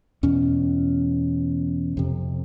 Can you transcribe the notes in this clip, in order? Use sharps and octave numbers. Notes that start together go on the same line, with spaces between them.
E2 B2 C#4
F2 C3